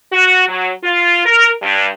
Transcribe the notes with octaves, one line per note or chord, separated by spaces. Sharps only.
F#4
F#3
F4
A#4
G2